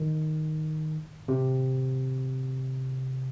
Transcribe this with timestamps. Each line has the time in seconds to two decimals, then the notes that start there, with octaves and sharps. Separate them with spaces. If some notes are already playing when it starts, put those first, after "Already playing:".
Already playing: D#3
1.28 C3